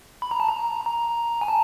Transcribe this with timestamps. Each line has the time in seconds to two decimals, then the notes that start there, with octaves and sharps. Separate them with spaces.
0.22 B5
0.31 A#5
0.40 A5
0.48 A#5
0.86 A#5
1.41 G#5
1.48 A5